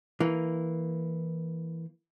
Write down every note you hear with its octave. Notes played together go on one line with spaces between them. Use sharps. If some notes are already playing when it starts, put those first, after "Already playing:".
E3 A#3